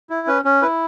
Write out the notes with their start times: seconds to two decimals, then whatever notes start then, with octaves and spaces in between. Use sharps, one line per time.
0.10 E4
0.27 C#4 B4
0.45 C#4
0.62 E4 B4